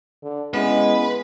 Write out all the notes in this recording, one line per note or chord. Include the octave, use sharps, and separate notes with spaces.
D3
G#3 B3 C#4 E4 B4